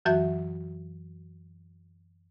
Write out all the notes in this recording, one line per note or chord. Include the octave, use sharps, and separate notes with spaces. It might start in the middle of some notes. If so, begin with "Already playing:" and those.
F#2 E3 F#3 F#4 E5 G6